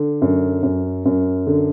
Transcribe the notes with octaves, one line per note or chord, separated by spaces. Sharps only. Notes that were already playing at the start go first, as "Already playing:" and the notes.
Already playing: D3
F#2
F#2
F#2
D3